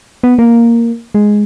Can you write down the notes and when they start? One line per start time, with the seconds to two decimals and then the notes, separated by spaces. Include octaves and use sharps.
0.23 B3
0.39 A#3
1.15 G#3